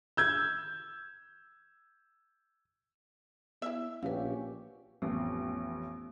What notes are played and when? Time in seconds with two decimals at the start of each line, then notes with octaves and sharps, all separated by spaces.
0.17 E6 G6 G#6
3.62 B3 E4 E5
4.03 A#1 C#4 F#4 G4 B4 F5
5.02 A1 F2 A3 B3